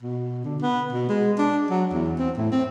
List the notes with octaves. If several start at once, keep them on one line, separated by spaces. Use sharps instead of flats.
B2
D3
B3
B2
G#3
D4
F#3
E2
C4
A2
C4